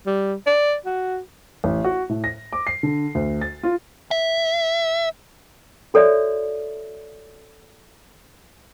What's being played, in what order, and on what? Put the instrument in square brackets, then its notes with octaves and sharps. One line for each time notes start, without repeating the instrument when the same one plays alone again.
[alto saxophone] G3
D5
F#4
[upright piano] A1
F#4
A2
A#6
D6
C7
D3
D2
A6
F4
[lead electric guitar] E5
[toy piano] F#4 A4 C#5 D5 E5